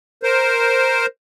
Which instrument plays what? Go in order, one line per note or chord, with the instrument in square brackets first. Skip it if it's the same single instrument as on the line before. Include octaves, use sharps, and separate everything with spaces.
[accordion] A#4 C5